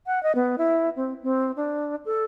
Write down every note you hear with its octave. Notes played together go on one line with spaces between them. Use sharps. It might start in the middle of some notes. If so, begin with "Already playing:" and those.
F#5
D#5
B3
E4
C4
C4
D4
A4